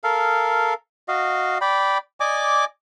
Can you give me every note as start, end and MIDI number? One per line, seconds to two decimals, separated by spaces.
0.04 0.74 69
0.04 0.74 70
0.04 0.74 77
1.08 1.58 66
1.08 1.58 75
1.08 1.58 77
1.61 1.98 74
1.61 1.98 79
1.61 1.98 83
2.20 2.65 74
2.20 2.65 75
2.20 2.65 80
2.20 2.65 86